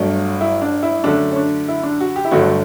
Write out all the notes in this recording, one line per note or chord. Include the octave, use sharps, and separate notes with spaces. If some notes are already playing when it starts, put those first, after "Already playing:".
Already playing: G1 G2 F#3 A3 D4
E4
D4
E4
F#2 D3 A3 D4
C#4
D4
E4
D4
F#4
G4
E4
G1 G2 D3 F#3 A3 F#4